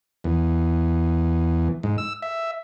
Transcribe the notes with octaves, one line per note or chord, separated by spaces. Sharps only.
E2
G#2
E6
E5